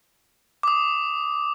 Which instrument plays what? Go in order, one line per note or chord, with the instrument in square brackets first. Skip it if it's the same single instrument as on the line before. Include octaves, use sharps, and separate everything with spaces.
[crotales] D6 D#6